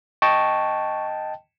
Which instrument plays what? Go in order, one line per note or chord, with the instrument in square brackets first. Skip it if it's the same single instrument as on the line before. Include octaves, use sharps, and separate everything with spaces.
[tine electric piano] D#5 G5 A5 [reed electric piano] C#6